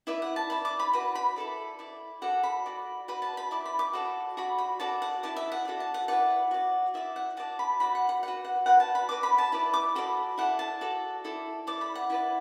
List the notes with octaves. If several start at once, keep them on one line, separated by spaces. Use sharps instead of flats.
E4 B4 D5 E5
F#5
A5
E4 D5 B5
D6
B5
F#4 B4 D5 B5
B5
E4 A4 D5
E4 D5
F#4 A4 D5 F#5
B5
F#4 D5
F#4 B4 D5 B5
A5
B5
E4 D5 D6
B5
D6
F#4 A4 D5
F#4 D5 B5
B5
F#4 A4 D5 A5
F#5
E4 D5 A5
E5
F#5
F#4 A4 D5
A5
F#5
E4 B4 D5 F#5
F#4 D5
E4 D5 E5
F#5
F#4 D5 A5
B5
F#4 D5 B5
F#5
F#5
F#4 B4 D5 F#5
F#5
F#4 B4 D5 F#5
A5
B5
F#4 B4 D5 D6
B5
A5
E4 B4 D5 B5
D6
F#4 A4 D5 B5
E4 A4 D5 F#5
A5
F#4 A4 D5
E4 A4 D5
E4 D5 D6
B5
F#5
E4 B4 D5